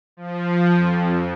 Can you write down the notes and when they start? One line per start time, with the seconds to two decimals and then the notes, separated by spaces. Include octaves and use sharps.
0.17 F3
0.74 F2